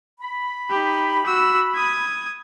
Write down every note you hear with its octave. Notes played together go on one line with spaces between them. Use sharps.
B5
D#4 G4
F#4 E6
D#6 G#6